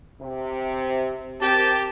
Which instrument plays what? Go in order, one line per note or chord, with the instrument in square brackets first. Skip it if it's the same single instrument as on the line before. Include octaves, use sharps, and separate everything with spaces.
[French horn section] C3
[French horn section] C4 A#4 [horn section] G4 [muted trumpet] A5